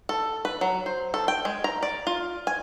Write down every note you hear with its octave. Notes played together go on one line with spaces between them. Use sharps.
A4
B4
F#3
C5
A4
G5
G#3
A#5
D5
F4
G#5